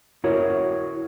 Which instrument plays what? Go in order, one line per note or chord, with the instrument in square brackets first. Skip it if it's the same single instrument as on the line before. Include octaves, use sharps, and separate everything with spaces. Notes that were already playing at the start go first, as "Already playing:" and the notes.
[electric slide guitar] E4 F#4 A#4 C#5